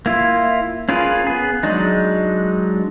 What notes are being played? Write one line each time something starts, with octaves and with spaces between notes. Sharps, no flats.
A#3 E4 F4
C#4 F4 G#4 A#4 B4
B3 G#4
F#3 G#3 D4 D#4